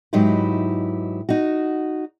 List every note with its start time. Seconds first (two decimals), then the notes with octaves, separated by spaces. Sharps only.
0.13 G#2 F#3 D#4 E4 G4 B4
1.29 D#4 F#4